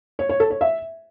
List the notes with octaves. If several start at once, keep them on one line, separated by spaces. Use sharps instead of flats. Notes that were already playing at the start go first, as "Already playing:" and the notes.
C#5
C#5
A4
C#5
E5